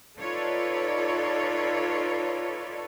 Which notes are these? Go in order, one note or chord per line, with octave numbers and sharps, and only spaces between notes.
D#4 F4 A4 B4 C#5 D5